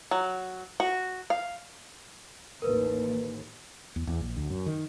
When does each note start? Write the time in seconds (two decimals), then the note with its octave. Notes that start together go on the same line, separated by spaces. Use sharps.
0.11 F#3
0.80 F#4
1.30 F5
2.62 A1 D#2 A#4 B4
3.96 E2
4.07 E2
4.21 A#1
4.36 D2
4.50 F#2
4.66 D#3